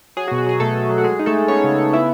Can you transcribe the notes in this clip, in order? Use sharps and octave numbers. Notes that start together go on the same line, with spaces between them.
F#3 G#4
F#4
B2
F#4
F#3 G#4
B2 A3 A4
A3
F#3
F#4
G#3 G#4
D#4
A3 A4
G#3
B3 C#4 C#5
C#3
C#3
B3 E4 E5